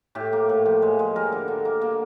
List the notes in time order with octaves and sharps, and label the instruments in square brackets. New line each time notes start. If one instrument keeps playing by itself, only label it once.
[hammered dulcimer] A2 G4
A#3
A2
F3
G#3
G#3
G3 A#4
D3
D3
A#3
A#3